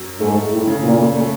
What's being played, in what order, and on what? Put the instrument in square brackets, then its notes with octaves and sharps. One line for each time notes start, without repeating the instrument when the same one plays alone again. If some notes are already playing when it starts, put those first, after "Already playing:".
Already playing: [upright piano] F#2 F#3
[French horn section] G#2 [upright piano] A3
[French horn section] A2
[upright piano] C#3
[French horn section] A#2
[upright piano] A3